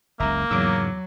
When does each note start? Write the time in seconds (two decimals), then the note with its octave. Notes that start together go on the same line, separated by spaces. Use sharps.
0.20 F#1 C#2 A#3 E5 A#5
0.51 E2 G#2 C#3 F#3 D6 E6